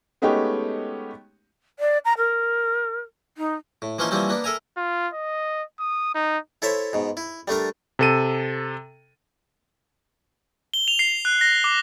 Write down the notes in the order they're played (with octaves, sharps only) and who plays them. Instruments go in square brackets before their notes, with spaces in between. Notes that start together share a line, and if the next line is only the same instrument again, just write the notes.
[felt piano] G#3 A3 B3 C#4 D#4 G4
[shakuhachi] D5
A#5
A#4
D#4
[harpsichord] A2
E3 F3 A#3 C#4 D#4 C6
E3 F3 G3 A#3 C4 C#4
A#3 B3 D4
A4 A#4 E5 G#5 A#5
[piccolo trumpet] F4
D#5
D#6
D#4
[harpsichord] E4 A4 C5 C#5 E5
G#2 B2
E4
G3 A3 D4 A#4
[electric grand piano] C3 A4 D#7
[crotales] G7
F7
C7
F#6
A#6
D6